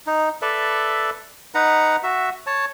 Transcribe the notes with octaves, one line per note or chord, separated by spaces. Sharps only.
D#4
A4 B4 D5 E5
D#4 B4 F#5 A#5
F#4 E5
C#5 A5